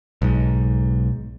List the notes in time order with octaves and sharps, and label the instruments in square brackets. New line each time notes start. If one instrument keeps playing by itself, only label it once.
[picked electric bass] B1 G#2